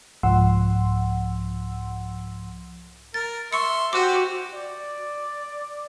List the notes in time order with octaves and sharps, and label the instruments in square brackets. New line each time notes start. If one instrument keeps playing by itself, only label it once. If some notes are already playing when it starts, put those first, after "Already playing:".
[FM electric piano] C2 G#2 F3 F#5 C6 E6
[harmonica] A#4 [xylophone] A6
[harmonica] E5 C6 [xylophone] C#6 C#7
[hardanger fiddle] F#4 [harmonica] G4 C5 [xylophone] D6 F#6
[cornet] D5